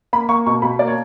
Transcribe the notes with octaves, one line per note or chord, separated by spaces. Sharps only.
A#3 B5
A#3 C#6
B2 C#6
B2 B5
A#3 D5
C#5